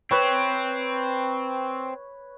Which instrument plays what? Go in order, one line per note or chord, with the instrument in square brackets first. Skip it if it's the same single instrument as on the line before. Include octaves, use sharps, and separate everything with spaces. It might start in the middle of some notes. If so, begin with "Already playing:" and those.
[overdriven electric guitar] C4 [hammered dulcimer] B4 C#5